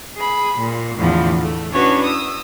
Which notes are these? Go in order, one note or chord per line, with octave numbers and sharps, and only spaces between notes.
G#4 B5
A#2
E2 A2 D3 E3 F3
A3
C#4 D4 E4 F#4 B4 C#5
D#6 E6